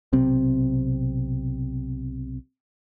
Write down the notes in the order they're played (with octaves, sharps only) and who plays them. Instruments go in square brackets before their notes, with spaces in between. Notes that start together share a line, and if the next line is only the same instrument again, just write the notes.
[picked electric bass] B1 C3 C4